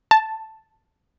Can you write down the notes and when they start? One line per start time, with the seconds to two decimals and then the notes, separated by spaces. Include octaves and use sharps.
0.11 A5